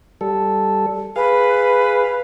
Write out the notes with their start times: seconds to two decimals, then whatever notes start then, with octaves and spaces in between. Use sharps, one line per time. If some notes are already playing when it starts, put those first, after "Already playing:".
0.21 G3 A4
1.16 G#4 B4 F5